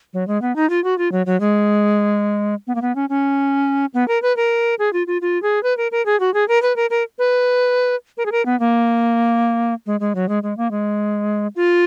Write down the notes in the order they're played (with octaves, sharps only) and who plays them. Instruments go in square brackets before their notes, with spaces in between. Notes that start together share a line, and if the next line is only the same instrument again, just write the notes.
[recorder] F#3
G#3
B3
D#4
F4
F#4
F4
F#3
F#3
G#3
B3
A#3
B3
C#4
C#4
B3
A#4
B4
A#4
G#4
F4
F4
F4
G#4
B4
A#4
A#4
G#4
F#4
G#4
A#4
B4
A#4
A#4
B4
A#4
G#4
A#4
B3
A#3
G#3
G#3
F#3
G#3
G#3
A#3
G#3
F4